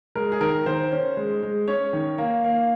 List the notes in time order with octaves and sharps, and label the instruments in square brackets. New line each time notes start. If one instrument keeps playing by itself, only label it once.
[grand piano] G#3 A#4
G#4
D#3 A#4
D#3 C5
C#4
G#3
G#3
C#4 C#5
D#3
A#3
A#3